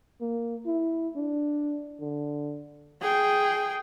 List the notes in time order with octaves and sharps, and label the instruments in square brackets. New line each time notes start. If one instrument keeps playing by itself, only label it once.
[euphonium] A#3
E4
D4
D3
[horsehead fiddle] G#4 G5